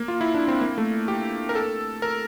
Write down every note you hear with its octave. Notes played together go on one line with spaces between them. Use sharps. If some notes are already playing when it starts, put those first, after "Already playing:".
Already playing: A#3
F4
E4
D4
C4
A#3
A3
G4
A#4
A4
A#4